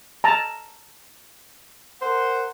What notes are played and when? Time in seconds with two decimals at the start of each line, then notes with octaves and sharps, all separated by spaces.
0.24 A5 A#5
2.02 A#4 C5 F#5